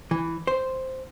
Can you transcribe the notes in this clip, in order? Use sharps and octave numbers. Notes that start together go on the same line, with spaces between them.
E3
C5